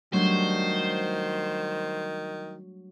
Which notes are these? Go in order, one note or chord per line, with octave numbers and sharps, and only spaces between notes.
D#3 F#3 G3 A3 D4 C5